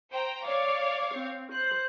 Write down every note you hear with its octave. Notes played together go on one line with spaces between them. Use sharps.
C5 G5 A#5
C#5 D5 F5
C4
C5 F#6